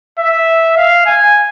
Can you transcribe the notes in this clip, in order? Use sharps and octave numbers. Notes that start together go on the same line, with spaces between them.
E5
F5
G#5